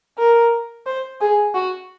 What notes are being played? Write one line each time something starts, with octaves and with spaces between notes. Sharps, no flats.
A#4
C5
G#4
F#4